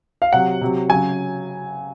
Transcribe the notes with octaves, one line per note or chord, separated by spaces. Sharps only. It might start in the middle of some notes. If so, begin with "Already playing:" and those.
F5
C3 F#3 F#5
C3 F#3
C#3 F#3 G#5